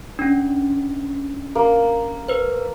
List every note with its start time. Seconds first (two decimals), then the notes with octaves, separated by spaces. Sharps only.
0.19 C#4 D4
1.55 A#3
2.28 B4 C5